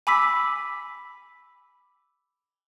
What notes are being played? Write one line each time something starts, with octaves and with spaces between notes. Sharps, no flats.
G#5 B5 D6 E6 B6